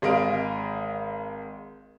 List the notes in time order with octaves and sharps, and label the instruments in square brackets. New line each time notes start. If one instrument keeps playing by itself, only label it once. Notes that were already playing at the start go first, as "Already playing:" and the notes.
[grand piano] G#1 G#3 D#5 F5 D7